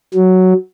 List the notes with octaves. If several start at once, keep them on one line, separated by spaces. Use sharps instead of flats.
F#3